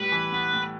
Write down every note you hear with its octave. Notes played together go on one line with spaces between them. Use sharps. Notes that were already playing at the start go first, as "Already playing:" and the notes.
Already playing: A2 G3 B3 B4
E3
B3
A2